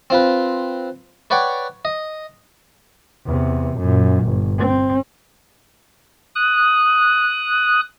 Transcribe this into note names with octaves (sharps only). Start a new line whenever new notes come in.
C4 F4 B4
B4 C#5 D5 F#5 G5
D#5
E2 C3
F#2 A#2
G1
C4
D#6 F#6